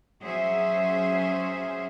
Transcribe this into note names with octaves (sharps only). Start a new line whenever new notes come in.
F#3 C#4 G#4 C5 E5